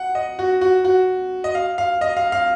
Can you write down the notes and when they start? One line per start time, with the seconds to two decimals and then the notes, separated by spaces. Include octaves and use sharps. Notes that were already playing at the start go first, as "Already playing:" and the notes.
Already playing: F#5
0.15 D#5
0.39 F#4
0.61 F#4
0.85 F#4
1.44 D#5
1.55 F5
1.78 F5
2.01 D#5
2.17 F5
2.32 F5